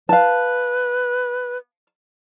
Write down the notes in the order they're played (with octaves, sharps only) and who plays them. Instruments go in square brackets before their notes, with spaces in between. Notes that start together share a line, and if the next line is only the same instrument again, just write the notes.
[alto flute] B4 [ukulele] F5 A5